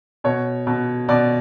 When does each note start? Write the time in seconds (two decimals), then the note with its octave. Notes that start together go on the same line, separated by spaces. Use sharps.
0.24 B2 C#5
0.67 B2
1.09 B2 D5